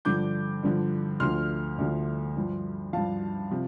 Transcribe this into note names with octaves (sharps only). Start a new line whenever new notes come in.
G2 D3 F3 D6 G6
G2 D3 F3
D2 D3 F3 C6 F6
D2 D3 F3
G2 F3
G2 F3 F5 A5
C3 F3